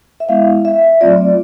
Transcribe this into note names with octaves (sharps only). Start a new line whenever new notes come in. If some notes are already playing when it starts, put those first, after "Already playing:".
E5
G#3 B3 E4 F5
E5
F#3 A3 C4 F4 D5